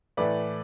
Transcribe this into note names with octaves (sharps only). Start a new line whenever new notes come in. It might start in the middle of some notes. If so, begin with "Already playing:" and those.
A2 E3 A3 B4 D5